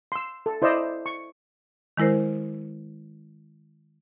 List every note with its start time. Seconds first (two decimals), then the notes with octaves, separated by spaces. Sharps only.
0.12 C6 E6
0.46 A4
0.62 E4 C5 D5 D#5 E6
1.06 C#6
1.97 D#3 G#3 E4 A#4 C5